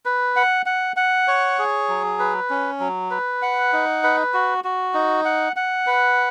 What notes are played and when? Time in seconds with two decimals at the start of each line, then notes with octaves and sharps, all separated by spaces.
0.05 B4
0.36 F#5
0.66 F#5
0.96 F#5
1.28 C#5
1.59 G#4
1.89 F#3
2.19 B4
2.50 C#4
2.80 F#3
3.11 B4
3.42 F#5
3.73 D#4
4.03 B4
4.34 F#4
4.64 F#4
4.94 D#4
5.25 F#5
5.56 F#5
5.87 B4